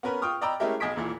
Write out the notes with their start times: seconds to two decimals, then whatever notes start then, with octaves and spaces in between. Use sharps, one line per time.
0.03 B3 C#4 A#4 B4
0.22 F4 G5 C#6 D#6 F6
0.41 D5 D#5 G5 A#5 B5 E6
0.60 G#3 A3 C#4 E4 G4 A#4
0.80 B1 G#4 D#5 G#6 B6 D7
0.96 D#1 A#2 E3